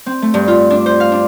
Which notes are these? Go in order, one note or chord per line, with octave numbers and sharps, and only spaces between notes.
C4
A3
G2
F4
D4
C5
F5
D4